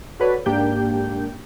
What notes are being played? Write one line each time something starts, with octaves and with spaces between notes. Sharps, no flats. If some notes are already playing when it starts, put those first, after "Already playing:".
F#4 A4 B4 C#5 D5
G#2 A#3 D4 G4 G5 G6